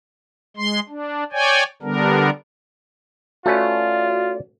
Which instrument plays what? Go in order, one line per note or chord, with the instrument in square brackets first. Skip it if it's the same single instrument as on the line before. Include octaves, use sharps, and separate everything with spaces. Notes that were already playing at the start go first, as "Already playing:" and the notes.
[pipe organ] G#3 C6
D4
C#5 D5 G5 G#5
D3 G3 B3 D4 A#4
[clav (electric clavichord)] A3 C#4 B4 [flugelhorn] F4 [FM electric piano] F#4 [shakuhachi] D5